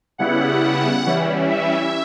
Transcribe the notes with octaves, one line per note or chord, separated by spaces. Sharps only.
C#3 G3 B3 E4 F#5
E3 G3 C#4 E4
E5